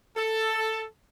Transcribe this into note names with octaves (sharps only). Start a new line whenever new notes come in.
A4